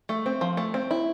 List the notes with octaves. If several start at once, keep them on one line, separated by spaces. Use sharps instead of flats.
A3
C4
F3
A3
C4
E4